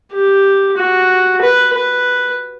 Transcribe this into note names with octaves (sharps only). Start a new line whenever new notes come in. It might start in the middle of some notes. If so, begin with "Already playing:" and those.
G4
F#4
B4
B4